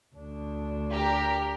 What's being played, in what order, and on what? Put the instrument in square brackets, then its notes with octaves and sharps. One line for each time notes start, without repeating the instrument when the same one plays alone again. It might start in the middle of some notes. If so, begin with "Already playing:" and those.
[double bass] D2 D4
[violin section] G4 A#4